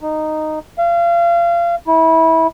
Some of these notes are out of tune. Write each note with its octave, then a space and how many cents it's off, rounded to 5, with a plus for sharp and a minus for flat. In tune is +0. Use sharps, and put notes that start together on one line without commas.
D#4 -10
F5 -30
E4 -25